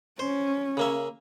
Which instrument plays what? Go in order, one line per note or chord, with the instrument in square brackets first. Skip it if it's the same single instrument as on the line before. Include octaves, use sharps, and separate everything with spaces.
[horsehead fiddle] C#4 [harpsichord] C5
[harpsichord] C#3 A#3 E5